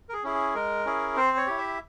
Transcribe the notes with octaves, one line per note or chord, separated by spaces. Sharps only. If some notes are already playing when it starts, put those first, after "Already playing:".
A#4
G#4
C#4 E4 G#4
G#4
G#3 A#4
C#4 E4 G#4
C4 C5
C#5
E4 G4
E5